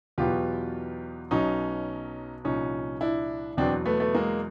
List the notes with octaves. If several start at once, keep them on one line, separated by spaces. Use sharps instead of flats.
E2 B2 F#3 F4 G4
B1 B2 F#3 C#4 D#4
C2 A#2 F3 C#4 D#4
D4 E4
E2 B2 F#3 C4 D4
A3 B3
A3 B3
G#3 A#3